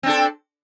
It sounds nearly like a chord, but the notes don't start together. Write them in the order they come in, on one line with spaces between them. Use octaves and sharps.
C4 D4 A4